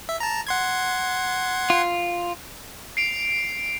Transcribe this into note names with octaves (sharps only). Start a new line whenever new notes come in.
E5
A5 A#5
F#5 C6 G#6
F4
C7 D7 F7